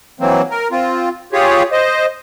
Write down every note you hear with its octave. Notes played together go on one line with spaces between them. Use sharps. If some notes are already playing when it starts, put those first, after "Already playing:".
E3 F#3 A#3 C4
A#4
C4 F4
F4 G4 G#4 C#5
C5 D#5